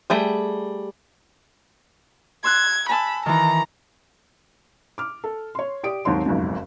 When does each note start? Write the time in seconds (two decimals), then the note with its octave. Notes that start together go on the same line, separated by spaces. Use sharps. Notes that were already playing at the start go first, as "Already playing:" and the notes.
0.10 G3 A3 G#4
2.44 C6 E6 F#6 G#6
2.89 G#5 A5 B5 E6
3.26 D#3 E3 A#5
4.98 D6 F6
5.24 A4
5.55 C#5 C6
5.83 G4 D5 D#6 D7
6.05 D#2 G#2 F#3 C4 C#5 C6
6.26 F#1 B1 F2 G#2